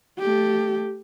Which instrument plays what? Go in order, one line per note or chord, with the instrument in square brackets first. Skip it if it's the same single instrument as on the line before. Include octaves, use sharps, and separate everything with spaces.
[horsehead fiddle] A3 G4